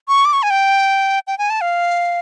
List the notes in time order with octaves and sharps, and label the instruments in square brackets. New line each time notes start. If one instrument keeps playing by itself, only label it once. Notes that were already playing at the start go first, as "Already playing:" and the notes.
[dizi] C#6
D6
C#6
G#5
G5
G5
G#5
A5
F5